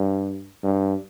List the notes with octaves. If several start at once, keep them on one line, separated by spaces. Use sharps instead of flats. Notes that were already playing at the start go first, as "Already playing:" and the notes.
Already playing: G2
G2